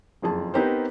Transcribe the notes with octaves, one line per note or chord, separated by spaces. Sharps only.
F#1 F2 G#4 A5
B3 C4 D#4 G4 A#4 C5